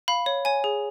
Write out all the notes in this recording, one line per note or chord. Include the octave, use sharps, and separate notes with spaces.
F5 B5
C#5
C#5 G#5
G#4